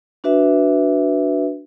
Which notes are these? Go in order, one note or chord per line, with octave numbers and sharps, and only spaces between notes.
D4 F#4 B4 E5